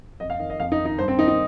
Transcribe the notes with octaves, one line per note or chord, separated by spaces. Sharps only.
F2 D#5
F5
D#3 D#5
D#5
F2 F5
D#4
D#3
D#4
G2 C5
C4
D#3 D#4
D#4